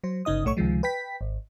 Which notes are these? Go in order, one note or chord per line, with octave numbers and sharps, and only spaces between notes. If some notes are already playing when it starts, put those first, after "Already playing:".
F#3 C5
G1 C#3 D#4 D#5 D#6
B1 A2 A3 C#5 C#6
C#2 C3 D#3 F3 G#3
B4 G5 B6
G#1